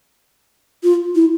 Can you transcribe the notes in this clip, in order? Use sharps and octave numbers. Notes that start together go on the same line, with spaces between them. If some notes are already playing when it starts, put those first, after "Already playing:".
F4
E4